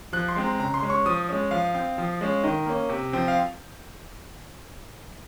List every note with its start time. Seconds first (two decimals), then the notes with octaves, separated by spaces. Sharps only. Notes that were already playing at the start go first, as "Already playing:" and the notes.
0.13 F3 F#6
0.29 C6
0.36 G#3 C4
0.44 A#5
0.60 C#3 A#5
0.74 C6
0.82 G#3 C#4
0.90 C#6
1.06 F3 D#6
1.29 G#3 C#4
1.51 F3 F5
1.74 C4
1.98 F3
2.21 G#3 C#4
2.43 D#3 D#5
2.66 A#3 C#4
2.89 C3
3.13 F3 C4
3.28 F5